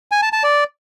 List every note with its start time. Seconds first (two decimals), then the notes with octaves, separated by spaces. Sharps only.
0.12 G#5
0.22 A5
0.33 A5
0.43 D5